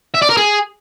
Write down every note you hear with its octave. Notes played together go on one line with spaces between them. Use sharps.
E5
D5
A#4
G#4